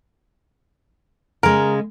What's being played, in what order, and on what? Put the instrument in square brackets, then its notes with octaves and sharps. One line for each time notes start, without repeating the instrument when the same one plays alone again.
[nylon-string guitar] C#3 G#3 [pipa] A#4